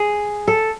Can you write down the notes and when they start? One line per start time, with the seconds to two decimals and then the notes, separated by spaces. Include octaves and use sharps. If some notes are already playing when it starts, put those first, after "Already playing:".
Already playing: G#4
0.48 A4